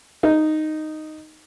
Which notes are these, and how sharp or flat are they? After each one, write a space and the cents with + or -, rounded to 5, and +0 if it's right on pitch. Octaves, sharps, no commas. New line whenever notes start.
D#4 -5